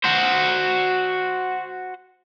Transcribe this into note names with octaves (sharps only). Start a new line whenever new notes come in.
F#4 C5